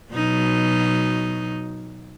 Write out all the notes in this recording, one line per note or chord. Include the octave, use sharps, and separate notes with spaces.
B2 F#3 D#4